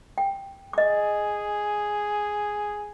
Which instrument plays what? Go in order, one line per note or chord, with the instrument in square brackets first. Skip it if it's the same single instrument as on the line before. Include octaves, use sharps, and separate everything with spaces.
[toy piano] G5
[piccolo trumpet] G#4 [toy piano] D#5 D6